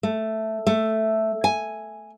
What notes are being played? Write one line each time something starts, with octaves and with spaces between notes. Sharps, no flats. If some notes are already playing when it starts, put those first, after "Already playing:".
A3
A3
G#5